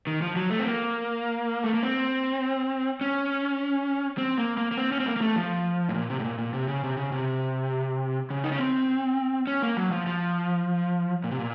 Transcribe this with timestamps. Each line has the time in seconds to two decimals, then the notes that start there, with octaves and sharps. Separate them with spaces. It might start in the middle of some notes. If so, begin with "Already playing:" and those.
0.07 D#3
0.22 F3
0.36 F#3
0.50 A3
0.59 C4
0.66 A#3
1.64 A3
1.74 A#3
1.83 C4
3.01 C#4
4.18 C4
4.38 A#3
4.57 A#3
4.72 A#3
4.78 C4
4.92 C#4
5.00 C4
5.06 A#3
5.16 A#3
5.22 A3
5.36 F3
5.89 A2
5.94 A#2
6.10 C3
6.20 A2
6.25 A#2
6.38 A#2
6.54 C3
6.68 C#3
6.84 C3
6.97 C#3
7.12 C3
8.30 C#3
8.44 D#4
8.52 C#4
8.60 C4
9.47 C#4
9.62 A#3
9.77 F#3
9.92 F3
10.07 F3
11.24 A#2
11.31 C3
11.39 A#2